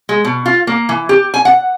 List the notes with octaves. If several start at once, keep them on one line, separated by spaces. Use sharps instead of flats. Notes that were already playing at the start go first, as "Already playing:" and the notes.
G#3
B2
F4
A#3
E3
G4
G#5
F#5